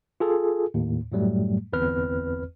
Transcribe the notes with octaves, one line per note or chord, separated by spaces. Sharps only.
F4 G#4 A4
D#2 A2
F#2 A2 F#3 G3 A3
G1 E2 C4 B4 F6